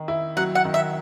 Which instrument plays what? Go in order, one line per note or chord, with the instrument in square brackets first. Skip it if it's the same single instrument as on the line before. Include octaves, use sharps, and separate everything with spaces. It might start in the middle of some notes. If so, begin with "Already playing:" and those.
Already playing: [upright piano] D#3
E4
[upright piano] F#3 [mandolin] F#5
[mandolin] F#5
[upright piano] D#3
[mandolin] E5